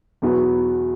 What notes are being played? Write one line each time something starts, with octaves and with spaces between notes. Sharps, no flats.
E2 B2 F#3 B3